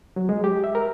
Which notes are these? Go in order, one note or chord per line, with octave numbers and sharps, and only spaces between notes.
F#3
G#3
G4
E5
A#4